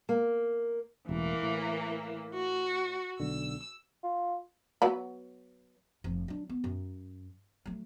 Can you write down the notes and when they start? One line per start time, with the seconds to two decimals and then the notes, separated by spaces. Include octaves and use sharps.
0.09 A#3
1.09 E1 A1 E3 A#3
1.42 A2
2.35 F#4
3.20 B1 D3 E6
4.03 F4
4.82 F#3 B3 B5
6.04 F1 F3
6.28 F#3 D4
6.49 B3
6.64 F#2
7.66 F#3 A3